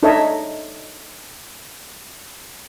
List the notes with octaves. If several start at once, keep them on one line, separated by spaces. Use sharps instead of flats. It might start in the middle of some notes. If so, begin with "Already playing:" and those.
D4 D#4 A4 C#5 D#5 E5